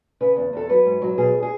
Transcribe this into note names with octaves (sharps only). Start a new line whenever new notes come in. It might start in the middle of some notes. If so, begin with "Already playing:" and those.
C#3 B4
E2
E2 A4
F#3 B4
G#2
F#3
B2 G#4
G#4